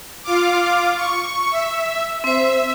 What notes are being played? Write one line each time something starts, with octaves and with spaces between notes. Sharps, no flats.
F4 F5 D6
C#6
E5
C4 C5 E5